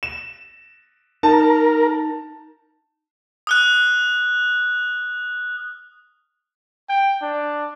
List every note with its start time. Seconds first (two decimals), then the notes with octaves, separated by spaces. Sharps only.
0.03 E7
1.23 D#4 A#4 A5
3.47 D#6 F6 F#6
6.89 G5
7.22 D4